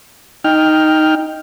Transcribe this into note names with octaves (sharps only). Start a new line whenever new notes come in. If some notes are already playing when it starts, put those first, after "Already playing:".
D#4 G5 F6